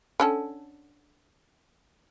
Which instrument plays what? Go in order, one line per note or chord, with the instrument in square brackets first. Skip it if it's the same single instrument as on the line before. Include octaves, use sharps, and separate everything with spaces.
[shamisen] D3 C#4 A4